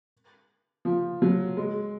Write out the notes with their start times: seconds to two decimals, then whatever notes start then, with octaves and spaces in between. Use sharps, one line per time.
0.85 F3
1.22 F#3
1.57 G#3